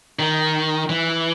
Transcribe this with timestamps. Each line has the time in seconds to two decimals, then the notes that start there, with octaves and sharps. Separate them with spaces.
0.19 D#3
0.89 E3